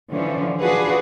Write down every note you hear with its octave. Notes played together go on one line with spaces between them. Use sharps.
D3 E3 F3 C#4
D4 F4 F#4 G#4 B4